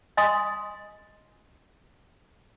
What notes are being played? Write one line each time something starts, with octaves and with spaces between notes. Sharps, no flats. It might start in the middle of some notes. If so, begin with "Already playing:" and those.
D#5 G#5 C6 D#6